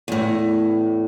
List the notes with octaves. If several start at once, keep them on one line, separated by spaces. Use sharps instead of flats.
E2 A2